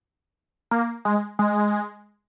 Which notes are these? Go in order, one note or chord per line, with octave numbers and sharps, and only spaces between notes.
A#3
G#3
G#3